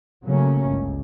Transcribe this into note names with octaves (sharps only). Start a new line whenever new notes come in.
C#3 F#3 A3 A#3 C#4
G1 C#2